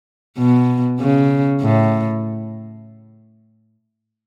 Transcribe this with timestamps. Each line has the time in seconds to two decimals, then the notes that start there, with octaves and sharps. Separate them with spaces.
0.38 B2
1.00 C#3
1.61 A2